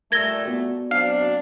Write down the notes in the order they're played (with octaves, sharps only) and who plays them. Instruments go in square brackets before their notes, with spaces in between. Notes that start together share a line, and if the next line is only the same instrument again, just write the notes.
[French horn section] A#2 G3 A3 [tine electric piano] A#4 E6 [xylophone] G#6 A#6 G7
[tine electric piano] B3 F#4 D5
[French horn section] F#3 C4 D4 [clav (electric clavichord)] F5